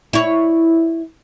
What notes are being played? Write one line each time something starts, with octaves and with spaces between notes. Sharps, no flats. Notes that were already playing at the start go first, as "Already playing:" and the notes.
E4 C#5